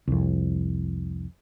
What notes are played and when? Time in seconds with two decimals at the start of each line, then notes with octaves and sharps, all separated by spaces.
0.08 C2 F2